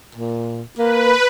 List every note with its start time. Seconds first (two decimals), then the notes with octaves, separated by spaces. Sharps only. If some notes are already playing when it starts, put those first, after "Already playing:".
0.15 A#2
0.78 A#3 B4